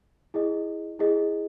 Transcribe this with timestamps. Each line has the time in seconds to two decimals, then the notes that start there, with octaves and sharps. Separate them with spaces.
0.34 E4 G#4 D#5
0.99 E4 G#4 D#5